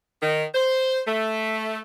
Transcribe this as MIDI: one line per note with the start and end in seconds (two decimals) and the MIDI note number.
0.21 0.43 51
0.54 0.99 72
1.07 1.78 57